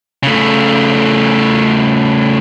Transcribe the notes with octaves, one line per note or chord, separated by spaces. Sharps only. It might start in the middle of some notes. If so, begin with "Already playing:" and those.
C#3 A3